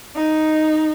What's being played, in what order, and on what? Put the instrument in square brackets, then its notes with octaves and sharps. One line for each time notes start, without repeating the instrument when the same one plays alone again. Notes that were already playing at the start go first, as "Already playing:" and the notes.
[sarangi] D#4